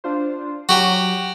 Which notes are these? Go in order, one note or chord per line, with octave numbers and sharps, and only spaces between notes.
D4 F4 C5
F#3 F#4 G4